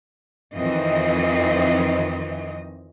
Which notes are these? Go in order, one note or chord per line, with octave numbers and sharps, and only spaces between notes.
F2 D#3 E3 C4 D#5